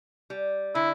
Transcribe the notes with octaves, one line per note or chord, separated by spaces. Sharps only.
G3
D3 E4